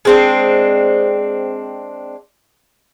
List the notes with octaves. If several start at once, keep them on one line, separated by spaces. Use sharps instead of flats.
G#3 C4 D4